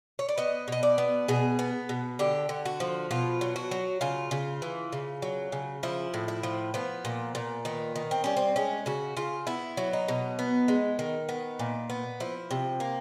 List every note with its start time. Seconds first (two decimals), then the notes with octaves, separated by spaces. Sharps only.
0.19 C#5
0.29 D5
0.38 B3 D#5
0.68 B2 D#5
0.83 D5
0.98 B3
1.28 B2 G#4
1.59 B3
1.89 B2
2.19 D3 G4
2.49 D3
2.65 F#4
2.80 F3
3.11 B2 F4
3.41 F#3
3.56 F#4
3.71 F#3
4.01 C#3 F4
4.31 C#3
4.62 E3
4.92 C#3
5.22 F#3
5.52 C#3
5.83 F3 E4
6.14 A2
6.28 E4
6.43 F3
6.74 F3 B3
7.05 A#2
7.35 A#2
7.65 D#3 B3
7.96 D#3
8.11 C4
8.24 G3 C#4
8.37 C4
8.56 G#3 C#4
8.86 C#3 F#4
9.17 C#3 F4
9.47 B3 E4
9.77 F#3
9.93 D#4
10.08 B2
10.39 B3
10.68 G#3
10.99 D#3
11.29 B3
11.59 A#2
11.90 B3
12.20 F3 E4
12.51 C3
12.80 A#3